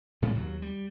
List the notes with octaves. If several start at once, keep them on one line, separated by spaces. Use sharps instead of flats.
A2 C#3 G3 G#3
D#2 F#3
G3